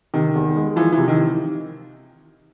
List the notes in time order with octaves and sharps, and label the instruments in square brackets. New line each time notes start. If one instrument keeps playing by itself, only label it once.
[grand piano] C3 [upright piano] D#3
[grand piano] E2
G#3
[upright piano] E3 [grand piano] F3
[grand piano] C3 [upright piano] E3
[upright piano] D#3